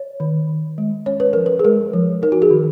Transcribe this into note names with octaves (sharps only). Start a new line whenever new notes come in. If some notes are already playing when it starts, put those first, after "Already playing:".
Already playing: C#5
D#3
D#3
G#3
C#4 C#5
B4
F3 A#4
B4
G#4
G#3 A#4
F3
D#4 A#4
F#4
G#4
D#3